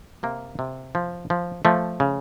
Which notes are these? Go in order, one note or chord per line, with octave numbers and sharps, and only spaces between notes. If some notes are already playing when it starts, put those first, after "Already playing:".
C3 A#3
C3
F3
F3
F3 A3
C#3